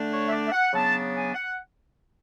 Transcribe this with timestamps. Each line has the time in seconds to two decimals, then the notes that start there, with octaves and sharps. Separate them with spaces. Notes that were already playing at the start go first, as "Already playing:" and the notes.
Already playing: D3 A3 D4
0.12 C#5
0.27 E5
0.32 D5
0.46 E5
0.52 F#5
0.73 C#3 F#3 B3 D4 A5
1.14 G#5
1.35 F#5